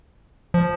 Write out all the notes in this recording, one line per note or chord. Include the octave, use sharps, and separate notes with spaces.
F3